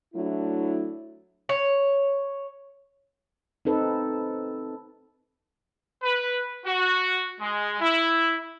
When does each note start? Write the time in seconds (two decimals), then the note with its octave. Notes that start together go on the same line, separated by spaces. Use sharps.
0.14 F#3 A3 D4 E4
1.49 C#5
3.65 C4 D#4 A4 B4
6.03 B4
6.66 F#4
7.40 G#3
7.81 E4